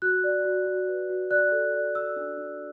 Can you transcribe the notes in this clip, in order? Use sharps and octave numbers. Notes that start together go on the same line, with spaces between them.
F#4 F#6
D5
F#4
F#4
B4
F#4
D5 F#6
A4
D5
A4 E6
D4
D4